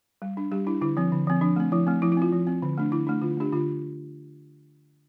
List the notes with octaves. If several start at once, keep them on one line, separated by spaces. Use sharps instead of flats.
G3
D4
G3 G4
D4 E4
D3 E4
F3 C4
D3
F3 C4
F3 D4
A3 C4
F3 E4
A3 C4
F3 E4
E4
C4 F4
F3
C4
D3
A3 D4
D3 E4
A3 D4
D3 F4
A3 D4 G4
D3 F4